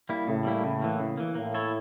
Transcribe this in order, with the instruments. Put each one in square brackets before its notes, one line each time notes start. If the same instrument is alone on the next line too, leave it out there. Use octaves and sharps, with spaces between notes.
[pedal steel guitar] G3 A#3 E4
[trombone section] A2 [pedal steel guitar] C#3
[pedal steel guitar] G3 A#3 E4
C#3
E3 A#3
C#3
E3 A#3
[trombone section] A2 [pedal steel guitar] A#3
[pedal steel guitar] E4 A4 C#5